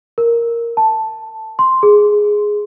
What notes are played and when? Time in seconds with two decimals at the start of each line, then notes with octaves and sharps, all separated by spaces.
0.18 A#4
0.77 A5
1.59 C6
1.83 G#4